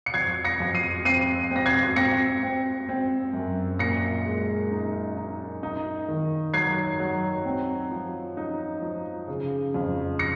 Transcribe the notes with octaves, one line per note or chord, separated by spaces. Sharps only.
C#7
F2 G#6 C7
A#6 C#7
F2
C7 D#7
C4 C7 D#7
C4 A#6
G#6 C7
C4 A#6 C#7
C4
C4
F#2
A#2 A#6 C#7
G#3
D#4
D#4
D#4
D#3
F#3 G#6 C7
F#3
C4
F3
D#4
F3
C#3
F2
A#6 C#7